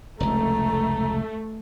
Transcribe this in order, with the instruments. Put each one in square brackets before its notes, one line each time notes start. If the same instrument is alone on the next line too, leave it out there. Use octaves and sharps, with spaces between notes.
[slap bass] F1 C#2 [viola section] A3 [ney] A#5